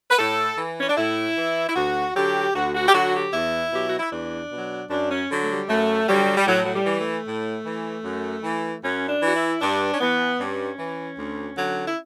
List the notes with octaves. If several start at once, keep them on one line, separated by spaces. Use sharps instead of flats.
B4
A2 A4
E3
C#4
D4
A2 E4
E3
E4
D2 F#4
D3 F#3 G4
D2 F#4
F#4
G4
D3 F#3 F#4
G4
E2 E4
B2 F#3 G4
F#4
E4
E2 D4
B2 F#3
F#2 D4
C#4
D3 F#3
A3
G3
F#2 A3
D3 F#3 G3
G3
A2 F#3
F#3
G3
E3
A3
A2
E3
F#2
E3
F#2 C#4
D4
E3 F#4
E4
G2 D4
C#4
E3 B3
G2 C#4
E3
D2
D3 F#3
E4